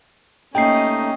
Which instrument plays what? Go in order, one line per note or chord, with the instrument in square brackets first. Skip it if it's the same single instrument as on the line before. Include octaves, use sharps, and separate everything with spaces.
[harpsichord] C3 A#3 [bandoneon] A3 D#4 [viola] C#4 D#5 [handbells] G5 C7